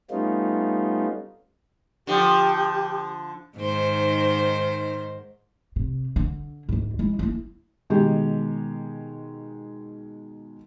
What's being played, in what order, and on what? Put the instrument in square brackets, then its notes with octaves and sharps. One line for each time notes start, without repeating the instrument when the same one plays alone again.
[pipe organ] G3 A3 B3 C#4 D#4 F4
[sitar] D3 F3 [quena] G4
[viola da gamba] G#2 D#3 C5
[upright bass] C3
D3
D2 G#2
G#3 E4
A#3 E4
[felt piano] B2 D#3 G#3 G4